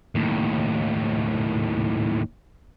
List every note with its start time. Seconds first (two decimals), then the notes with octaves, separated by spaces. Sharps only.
0.15 D#2 A2